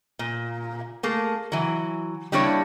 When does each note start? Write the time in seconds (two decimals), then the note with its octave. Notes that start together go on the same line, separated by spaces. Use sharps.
0.19 A#2
1.03 A3 A#3 G#4
1.52 E3 F#3
2.32 G3 A#3 D4 E4 C#5